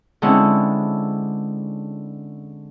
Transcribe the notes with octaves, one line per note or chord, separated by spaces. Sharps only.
D3 G#3 C4 C#4 E4